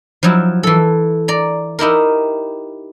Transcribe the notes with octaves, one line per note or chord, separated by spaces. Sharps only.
F3 F#3 E4
E3 A4
D5 A#5
D#4 E4 G4 A#4